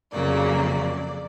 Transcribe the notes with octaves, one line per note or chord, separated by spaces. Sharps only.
F2 C#3 F#3 A#3 D5